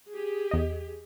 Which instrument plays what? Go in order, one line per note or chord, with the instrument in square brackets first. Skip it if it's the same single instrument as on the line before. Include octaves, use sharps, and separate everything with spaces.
[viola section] G4 G#4
[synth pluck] E2 D#5